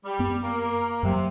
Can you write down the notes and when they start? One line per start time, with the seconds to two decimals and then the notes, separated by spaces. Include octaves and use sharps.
0.04 G3
0.19 F#2 B3
0.42 A#3
1.03 F#2 C3 F#3 A#3